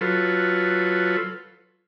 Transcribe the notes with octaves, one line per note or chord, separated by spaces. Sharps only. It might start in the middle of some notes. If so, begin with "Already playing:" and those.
F#3 F4 A4 B4